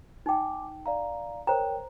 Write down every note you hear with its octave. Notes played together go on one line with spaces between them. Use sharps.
D#4 G5 G#5 D6
D5 F5 A#5
A#4 C5 C#5 G5 A#5